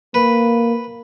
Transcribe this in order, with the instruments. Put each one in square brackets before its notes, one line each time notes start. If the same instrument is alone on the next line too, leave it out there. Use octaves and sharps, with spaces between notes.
[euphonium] A#3 [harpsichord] B4